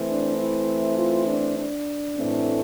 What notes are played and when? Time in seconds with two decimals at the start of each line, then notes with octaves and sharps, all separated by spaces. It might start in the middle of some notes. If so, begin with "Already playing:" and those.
Already playing: E3 A3 C4
0.10 D4
0.39 E4
0.98 F4
1.28 D4
1.58 D4
2.17 A2 E3 A3 C4